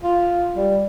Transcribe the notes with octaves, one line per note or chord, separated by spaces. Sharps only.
F4
G3